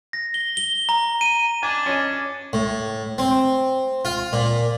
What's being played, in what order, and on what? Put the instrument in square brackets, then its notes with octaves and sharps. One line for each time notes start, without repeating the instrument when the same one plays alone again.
[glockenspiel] A#6
G7
G7
A#5
D#7
[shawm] D4 [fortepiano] G#5
[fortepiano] C#4 D#5
[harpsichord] A2
C4
F4
A#2